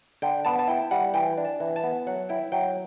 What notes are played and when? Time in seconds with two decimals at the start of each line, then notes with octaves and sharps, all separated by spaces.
0.22 D3 G5
0.45 B3 A5
0.59 A5
0.68 E4 G5
0.91 G3 F#5
1.14 E3 G5
1.37 D4
1.45 A5
1.60 E3
1.76 A5
1.84 B3
2.07 F#3 F#5
2.29 E4 G5
2.52 F#3 G5